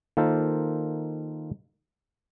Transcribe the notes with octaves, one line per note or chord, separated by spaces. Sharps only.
D#3 A#3 F4 A4 C5